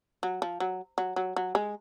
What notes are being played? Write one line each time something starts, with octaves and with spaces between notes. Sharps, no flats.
F#3
F3
F#3
F#3
F#3
F#3
G#3